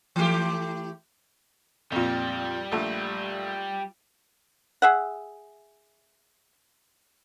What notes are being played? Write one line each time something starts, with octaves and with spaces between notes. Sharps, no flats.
E3 A3 G4
F2 A#2 G3
A#1 A3
G#4 E5 F#5